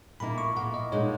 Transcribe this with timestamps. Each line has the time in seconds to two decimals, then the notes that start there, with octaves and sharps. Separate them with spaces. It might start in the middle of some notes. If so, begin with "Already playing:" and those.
0.20 A#2 A#3 E4 B5
0.38 C#6
0.56 A#2 A#3 E4 F#5
0.74 D#5
0.92 A#2 G#3 D#4 C#5